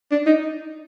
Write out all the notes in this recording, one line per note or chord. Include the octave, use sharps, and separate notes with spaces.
D4
D#4